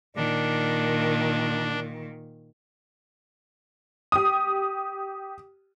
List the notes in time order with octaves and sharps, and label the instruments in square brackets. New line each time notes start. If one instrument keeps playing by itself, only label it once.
[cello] A#2 D#3 [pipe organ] D4
[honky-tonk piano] G4 D#6